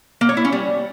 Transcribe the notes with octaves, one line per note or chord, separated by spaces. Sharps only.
A#3
C#5
E4
C#4
G3